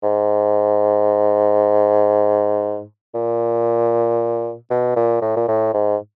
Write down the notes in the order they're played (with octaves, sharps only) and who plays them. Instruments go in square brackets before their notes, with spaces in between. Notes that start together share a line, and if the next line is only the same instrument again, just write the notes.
[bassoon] G#2
A#2
B2
A#2
A2
A#2
A2
G#2